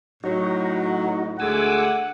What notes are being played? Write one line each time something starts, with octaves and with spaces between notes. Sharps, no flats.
A2 F#3 D#4 F#4
D2 G#3 A3 F#5 G#5 D6 E6